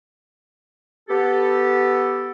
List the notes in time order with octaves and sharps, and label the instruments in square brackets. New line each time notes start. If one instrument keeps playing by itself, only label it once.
[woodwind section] B3 G4 A4